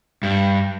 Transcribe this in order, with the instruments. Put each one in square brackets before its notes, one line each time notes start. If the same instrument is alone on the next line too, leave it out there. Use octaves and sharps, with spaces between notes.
[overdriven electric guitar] G2